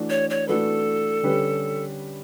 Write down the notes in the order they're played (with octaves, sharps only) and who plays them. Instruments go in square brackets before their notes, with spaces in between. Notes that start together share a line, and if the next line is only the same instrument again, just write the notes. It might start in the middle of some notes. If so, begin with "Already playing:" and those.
Already playing: [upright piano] E3 A3 D4 F#4
[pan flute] C#5
C#5
[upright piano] E3 A3 D4 F#4 B4 [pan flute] A4
[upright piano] D3 G3 C#4 G4 B4